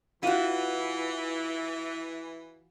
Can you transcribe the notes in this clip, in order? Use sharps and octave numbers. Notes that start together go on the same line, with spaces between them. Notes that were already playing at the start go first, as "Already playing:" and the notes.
E3 F4 F#4